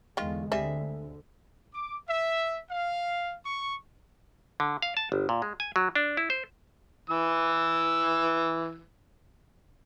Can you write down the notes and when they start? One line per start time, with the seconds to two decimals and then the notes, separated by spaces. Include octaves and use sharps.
0.17 E2 D3 D#3 G#3 F4
0.52 D2 D3 G3 C4 G#4 E5
1.74 D6
2.08 E5
2.70 F5
3.45 C#6
4.60 D3
4.82 F5
4.97 A5
5.12 G1
5.29 A#2
5.42 G#3
5.60 G#5
5.76 F#3
5.95 D4
6.17 E4
6.30 C5
7.10 E3 E6